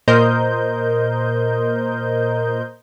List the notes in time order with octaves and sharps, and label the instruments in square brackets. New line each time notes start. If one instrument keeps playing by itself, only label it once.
[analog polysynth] A#2 A#4 C5 D#5 G6